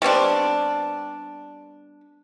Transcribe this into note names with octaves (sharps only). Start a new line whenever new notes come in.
G3 B3 C4 D4